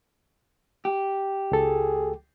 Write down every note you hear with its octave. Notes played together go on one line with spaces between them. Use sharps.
G4
C#2 G#4 A4